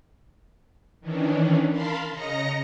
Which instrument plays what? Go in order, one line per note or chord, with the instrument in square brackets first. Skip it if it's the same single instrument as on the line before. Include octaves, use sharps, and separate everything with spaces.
[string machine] D#3 E3 C#4 D4
A#4 F5 A5 B5 C6
C#3 D#5 A#5 A#6 C#7